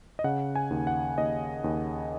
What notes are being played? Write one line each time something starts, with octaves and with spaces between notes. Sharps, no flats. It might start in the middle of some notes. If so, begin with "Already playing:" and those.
D#5
C#3 F#5
G#5
D#2
F#5
D#2 D#5
D#2